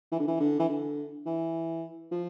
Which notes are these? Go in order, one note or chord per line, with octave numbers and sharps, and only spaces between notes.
E3
D3
E3
D3
E3
D3
E3
F3